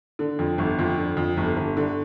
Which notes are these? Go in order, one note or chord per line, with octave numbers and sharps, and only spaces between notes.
D3
F2
G1
F2
D3
F2
G1
G1
D3